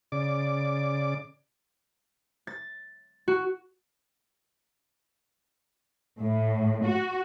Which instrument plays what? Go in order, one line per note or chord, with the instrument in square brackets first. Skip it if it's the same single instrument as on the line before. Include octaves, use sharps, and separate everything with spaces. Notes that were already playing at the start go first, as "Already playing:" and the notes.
[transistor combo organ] C#3 D5 D6
[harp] A6
F#4
[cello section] A2
F#4